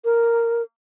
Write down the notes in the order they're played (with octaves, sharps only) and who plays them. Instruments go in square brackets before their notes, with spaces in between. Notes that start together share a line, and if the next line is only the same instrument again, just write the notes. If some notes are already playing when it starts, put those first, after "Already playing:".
[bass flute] A#4